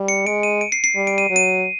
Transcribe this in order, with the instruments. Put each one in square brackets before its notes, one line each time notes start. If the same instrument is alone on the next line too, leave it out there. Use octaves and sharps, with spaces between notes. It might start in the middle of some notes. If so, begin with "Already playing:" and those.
Already playing: [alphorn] G3
[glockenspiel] C#7
[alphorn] G#3 [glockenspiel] D7
[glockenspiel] D#7
D7
C7
C7
[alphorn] G3
[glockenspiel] D7
D#7
[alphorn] F#3
[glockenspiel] D#7